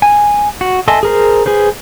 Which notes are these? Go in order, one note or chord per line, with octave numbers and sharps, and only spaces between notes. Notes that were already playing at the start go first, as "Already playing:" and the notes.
G#5
F#4
A4 D#5 E5 G#5 C6
G#4 A#4 C5
G#4 B4 C5